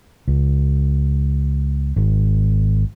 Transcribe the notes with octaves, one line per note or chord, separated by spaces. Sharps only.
C#2
G#1